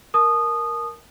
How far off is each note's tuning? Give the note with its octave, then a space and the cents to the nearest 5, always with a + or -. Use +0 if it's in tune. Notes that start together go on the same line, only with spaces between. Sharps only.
A#4 +0 A5 -30 D#6 -20